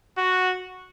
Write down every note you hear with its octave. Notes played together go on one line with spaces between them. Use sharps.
F#4